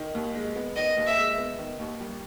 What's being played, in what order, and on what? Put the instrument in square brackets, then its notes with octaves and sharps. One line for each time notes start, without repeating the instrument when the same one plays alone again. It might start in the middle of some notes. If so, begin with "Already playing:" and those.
Already playing: [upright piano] D#3
D#2
G#3
B3
[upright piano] D#3 [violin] D#5
[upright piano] D#2
[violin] E5
[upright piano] G#3
B3
D#3
D#2
G3